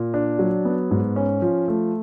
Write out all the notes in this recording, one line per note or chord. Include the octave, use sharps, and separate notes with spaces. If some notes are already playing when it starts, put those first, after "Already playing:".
Already playing: A#2
D4
F#3
B3
G#2
C#4
F3
A3